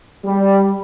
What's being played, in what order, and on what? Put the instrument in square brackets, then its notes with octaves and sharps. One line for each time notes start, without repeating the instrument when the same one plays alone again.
[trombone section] G3